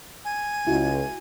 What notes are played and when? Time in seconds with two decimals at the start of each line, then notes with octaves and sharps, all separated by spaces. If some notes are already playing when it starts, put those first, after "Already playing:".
0.25 G#5
0.67 C#2 E4 F#4